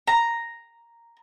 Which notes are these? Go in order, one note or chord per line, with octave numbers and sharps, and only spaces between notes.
A#5